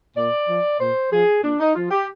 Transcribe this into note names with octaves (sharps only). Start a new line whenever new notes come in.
A#2 D5
F3
A#2 C5
F3 G#4
A#2 D4
D#4
F3 F4
G4